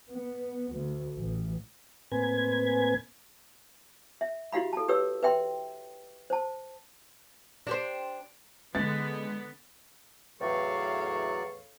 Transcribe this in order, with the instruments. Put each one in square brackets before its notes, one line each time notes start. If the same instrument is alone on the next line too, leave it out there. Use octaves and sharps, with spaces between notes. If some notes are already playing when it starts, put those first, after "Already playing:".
[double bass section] B3
D2
A1
[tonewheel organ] A2 A#3 C4 B4 G#5 G#6
[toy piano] E5
E4 F#4 G4 F5 B5
A4 A5
G4 B4 C#5 E6
B4 E5 G5 C6
C5 A5
[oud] D4 G4 C5
[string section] D3 [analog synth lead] G#3 [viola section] B3 [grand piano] A6
[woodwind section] E2 A2 C#6 [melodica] F#3 D5 [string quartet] A4 C#5 F5